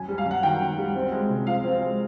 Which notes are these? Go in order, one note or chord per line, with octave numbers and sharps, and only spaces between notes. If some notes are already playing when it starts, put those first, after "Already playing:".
Already playing: F#2 G#5
G3
F5
F#2
F#5
D#3 G5
F#2
G3
C4
G#3
C3
F3 F5
C4
G#3